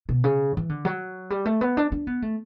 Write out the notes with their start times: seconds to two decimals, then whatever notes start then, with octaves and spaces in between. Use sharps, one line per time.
0.09 B2
0.24 C#3
0.57 E3
0.69 D3
0.85 F#3
1.30 G3
1.46 A3
1.61 B3
1.77 D4
1.92 D4
2.07 B3
2.22 A3